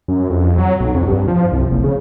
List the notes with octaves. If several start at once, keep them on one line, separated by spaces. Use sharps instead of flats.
F#2
F2
F#3
B1
F2
G2
F3
C2
F#1
C#3